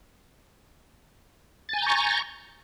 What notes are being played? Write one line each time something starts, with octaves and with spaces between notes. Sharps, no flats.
G#5 A#5 C#6 G6 A6